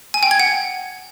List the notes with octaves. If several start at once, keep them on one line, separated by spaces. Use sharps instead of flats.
G#5
G5
G#6
F#5